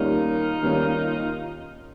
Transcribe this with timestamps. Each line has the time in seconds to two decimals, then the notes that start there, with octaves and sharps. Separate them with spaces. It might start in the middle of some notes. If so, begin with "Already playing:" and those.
Already playing: D#2 D#3 G3 A#3 C#4 D#4 F4
0.62 D#2 D#3 G3 A#3 C#4